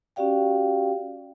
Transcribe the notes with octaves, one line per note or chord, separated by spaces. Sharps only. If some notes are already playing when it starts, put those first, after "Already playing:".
C#4 F#4 G4 D5 F5 G5